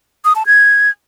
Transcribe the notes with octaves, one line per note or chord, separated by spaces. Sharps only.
D#6
A5
G#6